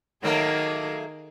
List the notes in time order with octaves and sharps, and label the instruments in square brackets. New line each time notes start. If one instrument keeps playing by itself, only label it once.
[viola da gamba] D#3 G#4 [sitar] F#3 A3 A#3